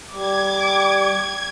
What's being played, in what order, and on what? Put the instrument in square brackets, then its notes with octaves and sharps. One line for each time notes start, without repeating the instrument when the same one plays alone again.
[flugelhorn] G3 [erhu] D6 [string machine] G#6